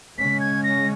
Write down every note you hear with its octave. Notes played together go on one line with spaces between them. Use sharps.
C#3 G#3 C#4 B6
G#6
A#6